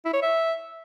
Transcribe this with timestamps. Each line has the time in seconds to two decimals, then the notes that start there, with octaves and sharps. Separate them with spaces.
0.05 E4
0.14 C#5
0.22 E5